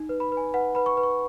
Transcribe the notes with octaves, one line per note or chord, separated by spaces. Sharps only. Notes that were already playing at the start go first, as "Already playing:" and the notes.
Already playing: D#4
B4
B5
B4
G#5
B4 F#5
B4 B5
C#6
B4
C#6